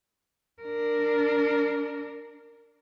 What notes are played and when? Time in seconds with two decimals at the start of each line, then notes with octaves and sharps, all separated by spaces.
0.62 D4 A#4